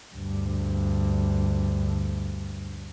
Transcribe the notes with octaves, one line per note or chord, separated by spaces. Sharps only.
D2 G2